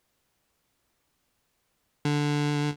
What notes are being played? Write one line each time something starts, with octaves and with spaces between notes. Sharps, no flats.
D3